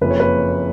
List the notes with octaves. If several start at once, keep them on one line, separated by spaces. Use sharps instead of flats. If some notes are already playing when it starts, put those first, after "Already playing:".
F#1 F2 F3 A#3 B4
C#5
B4